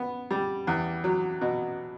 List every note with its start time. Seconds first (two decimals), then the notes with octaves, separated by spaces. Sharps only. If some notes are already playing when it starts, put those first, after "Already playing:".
Already playing: B3
0.31 G3
0.67 E2
1.04 F#3
1.41 B2